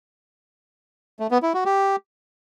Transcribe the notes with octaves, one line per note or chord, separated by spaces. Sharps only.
A3
B3
E4
F#4
G4